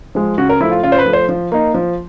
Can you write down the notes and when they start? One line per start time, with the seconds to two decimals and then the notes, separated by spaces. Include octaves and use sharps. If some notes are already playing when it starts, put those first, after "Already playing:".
0.15 F3 G#3
0.38 C#3 F#4
0.49 A#4
0.60 F3 A3 E4
0.72 F4
0.83 C#3 F4
0.92 C5
0.99 B4
1.06 F3 A3
1.13 C5
1.29 F3
1.52 A#3 D#4
1.74 F3